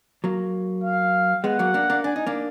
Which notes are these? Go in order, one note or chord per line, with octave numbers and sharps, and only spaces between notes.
F#3 A#3
F5
G#3 B3 F#5
F#3 A#3
A#3 D4
A#3 D4
D4 G#5
D#4
A#3 D4